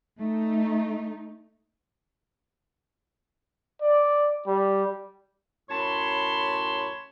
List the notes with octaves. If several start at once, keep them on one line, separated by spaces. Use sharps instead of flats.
A3 D#4
D5
G3
F#2 A2 C#5 A5 B5 C6